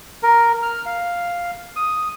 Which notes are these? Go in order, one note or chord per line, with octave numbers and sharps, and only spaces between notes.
A#4
F6
F5
D#6